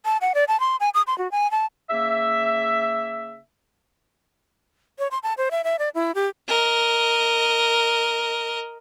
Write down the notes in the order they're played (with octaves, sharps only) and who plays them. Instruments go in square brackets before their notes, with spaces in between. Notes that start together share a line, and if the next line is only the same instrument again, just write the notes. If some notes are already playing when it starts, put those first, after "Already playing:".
[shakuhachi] A5
F#5
D5
A5
C6
G#5
D#6
C6
F#4
G#5
A5
[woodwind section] C#3 A#3 E5
[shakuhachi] C#5
C6
A5
C5
E5
E5
D5
E4
G4
[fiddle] A#4 D#5